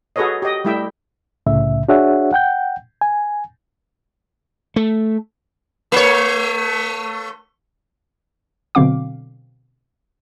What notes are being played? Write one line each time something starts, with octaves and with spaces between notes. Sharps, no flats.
F#4 G#4 A4 B4 C#5 D#5
G4 D#5
G3 A3 E4 E5 G5
C2 A2 C#3 E5
D4 F#4 G#4 C#5 E5 F#5
F#5 G5 G6
G#5
A3
A3 C#5
B2 D3 F#3 C4 F5 D6